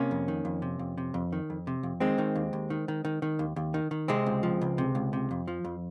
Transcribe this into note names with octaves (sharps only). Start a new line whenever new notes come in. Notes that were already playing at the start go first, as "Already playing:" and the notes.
Already playing: C3 A#3 C#4
F2
D#3
F2
C3
F2
C3
F2
D#3
F2
C3
F2
D#3 G#3 C4
D#3
D#2
D#2
D#3
D#3
D#3
D#3
D#2
D#2
D#3
D#3
C3 G#3 C4
C#2
F3
C#2
C3
C#2
C3
F2
F3
F2